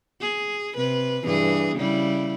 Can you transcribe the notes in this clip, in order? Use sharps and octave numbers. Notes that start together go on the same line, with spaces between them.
G#4
C3 B4
G2 E3 G#4
C#3 G3 E4